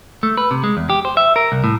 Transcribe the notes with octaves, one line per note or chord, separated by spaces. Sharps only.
A3
B4
C3
G#3
E2
G4
C5
E5
A#4
C2
A2